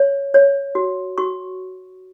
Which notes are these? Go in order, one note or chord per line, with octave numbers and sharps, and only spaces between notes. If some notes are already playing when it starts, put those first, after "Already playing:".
Already playing: C#5
C#5
F#4
F#4 C#6